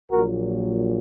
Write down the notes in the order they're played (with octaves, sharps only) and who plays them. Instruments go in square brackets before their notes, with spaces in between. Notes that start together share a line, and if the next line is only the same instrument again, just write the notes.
[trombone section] A#1 A#2 F#3 F#4 A#4